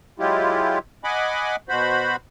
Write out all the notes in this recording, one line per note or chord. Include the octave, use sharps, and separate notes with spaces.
F#3 G#3 E4 F4 G4
D#5 F#5 G#5 B5 D6
B2 F#4 C5 B5